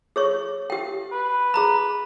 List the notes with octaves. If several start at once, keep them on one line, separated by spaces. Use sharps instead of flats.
G#4 C#5 C#6
G4 G5
B4
G#4 A#5 B5